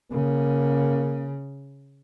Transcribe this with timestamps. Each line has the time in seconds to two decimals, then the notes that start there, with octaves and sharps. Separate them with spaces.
0.12 C#3 A#3